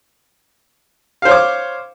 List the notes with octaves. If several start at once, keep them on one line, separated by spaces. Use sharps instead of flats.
C5 C#5 F5 D6